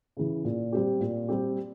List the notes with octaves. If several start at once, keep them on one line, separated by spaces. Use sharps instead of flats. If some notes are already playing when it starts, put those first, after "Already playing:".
C#3 E3
A#2
G3 C4 G4
A#2
G3 C4 G4